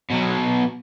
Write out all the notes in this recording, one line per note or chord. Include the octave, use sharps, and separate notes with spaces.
B2 F#3